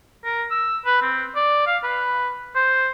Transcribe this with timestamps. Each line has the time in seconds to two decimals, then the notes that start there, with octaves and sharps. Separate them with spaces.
0.25 A#4
0.51 E6
0.86 B4
1.02 C4
1.36 D5
1.67 F5
1.84 B4
2.56 C5